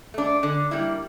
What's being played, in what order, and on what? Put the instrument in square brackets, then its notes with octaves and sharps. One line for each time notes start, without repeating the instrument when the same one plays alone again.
[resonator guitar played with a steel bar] A3 D4
D3
G3 A#3 E4